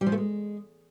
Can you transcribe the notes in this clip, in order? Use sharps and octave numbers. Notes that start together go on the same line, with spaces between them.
G3
F3
A3
G#3